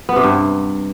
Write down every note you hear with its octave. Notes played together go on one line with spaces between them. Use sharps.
B3
C3
G2